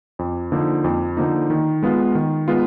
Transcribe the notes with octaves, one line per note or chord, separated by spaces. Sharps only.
F2
D3 F3 A#3 D#4
F2
D3 F3 A#3 D#4
D#3
G#3 B3 F4
D#3
G#3 B3 F4